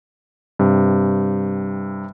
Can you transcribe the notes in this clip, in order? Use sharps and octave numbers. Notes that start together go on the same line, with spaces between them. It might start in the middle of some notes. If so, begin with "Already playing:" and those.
G2 C3